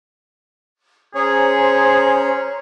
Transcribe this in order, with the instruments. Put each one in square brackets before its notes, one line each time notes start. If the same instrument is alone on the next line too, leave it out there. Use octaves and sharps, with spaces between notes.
[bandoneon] C#4 C#5 [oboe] G#4 [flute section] C5 A#5